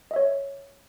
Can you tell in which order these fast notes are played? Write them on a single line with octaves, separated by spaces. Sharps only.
D#5 E5 C#5